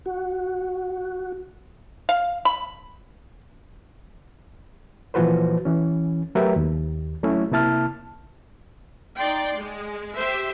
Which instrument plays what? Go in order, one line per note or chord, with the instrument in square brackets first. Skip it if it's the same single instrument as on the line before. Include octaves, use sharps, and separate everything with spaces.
[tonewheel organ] F#4
[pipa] F5
B5
[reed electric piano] A#2 E3 F3 F#4 B4 C5
E3 C#4
F#3 A3 G4 A#4 B4 E5
D#2
F#3 A3 C#4 E4
C3 A#3 E4 A5 F6
[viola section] D#4 D5 G5 C6
G#3
G4 C5 E5